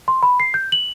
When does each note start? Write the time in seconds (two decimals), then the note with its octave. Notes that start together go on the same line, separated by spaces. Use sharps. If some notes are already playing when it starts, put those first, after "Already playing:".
0.08 C6
0.23 B5
0.40 C7
0.54 G6
0.72 F#7